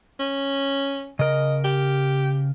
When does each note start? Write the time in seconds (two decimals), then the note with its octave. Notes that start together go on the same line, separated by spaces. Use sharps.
0.20 C#4
1.19 C#3 A#4 D#5
1.65 G4